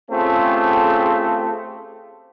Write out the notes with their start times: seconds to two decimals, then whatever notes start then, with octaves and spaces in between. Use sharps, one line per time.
0.10 A3 C4 C#4 F4 G4 G#4